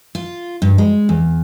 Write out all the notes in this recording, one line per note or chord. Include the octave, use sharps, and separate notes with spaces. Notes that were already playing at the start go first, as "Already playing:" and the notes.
F4
G2
G#3
E2